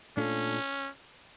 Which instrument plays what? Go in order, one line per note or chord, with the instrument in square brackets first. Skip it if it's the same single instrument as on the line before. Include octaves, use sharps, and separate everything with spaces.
[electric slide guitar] A#2 A3 D4 F4 A4 [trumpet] C#4